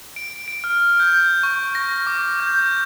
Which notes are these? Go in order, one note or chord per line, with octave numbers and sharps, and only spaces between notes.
D7
D7
F6
G6
C#6
A#6
D6
G6